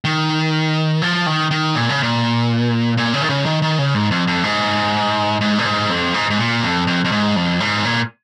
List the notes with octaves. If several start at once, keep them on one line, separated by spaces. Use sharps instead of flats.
D#3
F3
D#3
D#3
A#2
C#3
A#2
A#2
C#3
D#3
C#3
D#3
D#3
C#3
G#2
F2
F2
G#2
G#2
A#2
G#2
F2
G#2
G#2
A#2
F2
F2
F2
G#2
F2
G#2
A#2